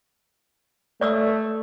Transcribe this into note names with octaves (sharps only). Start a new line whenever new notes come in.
A3 D5 D#6 E6